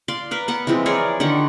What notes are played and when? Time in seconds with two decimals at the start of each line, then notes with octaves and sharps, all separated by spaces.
0.08 D5 F5 C6
0.31 A#4 B4
0.48 B3 F#5
0.67 E3 F3 G#3 C4
0.86 G#4 A#4 C#5 D5
1.20 D3 D#3 G4 F#5